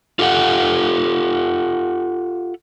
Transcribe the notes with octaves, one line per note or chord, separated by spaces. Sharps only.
F4 G4 A4 F5 F#5